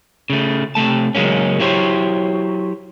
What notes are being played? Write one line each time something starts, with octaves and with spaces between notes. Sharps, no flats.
C#3 A3
C3 G#3 A3 A5
C#3 F#3 G#3 A#3 C#4
F#3 E4 G4 C5 C#5